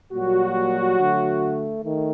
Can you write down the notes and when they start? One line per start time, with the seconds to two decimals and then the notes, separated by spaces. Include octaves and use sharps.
0.12 A#2 F#3 G3 A#3 F#4
0.98 D3 A3
1.84 D#3 A3